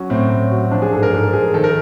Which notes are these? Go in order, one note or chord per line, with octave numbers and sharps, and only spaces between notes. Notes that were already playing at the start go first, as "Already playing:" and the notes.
Already playing: F#3 C#4
A2 C4
A2
F#3
F3 D4
G#4
G#2 A4
A#4
G#2 A4
F3 G#4
D#3 A4
A#4